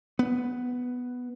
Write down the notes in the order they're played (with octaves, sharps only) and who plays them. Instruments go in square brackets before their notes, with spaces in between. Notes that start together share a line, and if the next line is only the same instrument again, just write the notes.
[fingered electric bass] B3